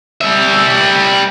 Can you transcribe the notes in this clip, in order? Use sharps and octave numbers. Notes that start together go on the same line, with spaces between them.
G3 E5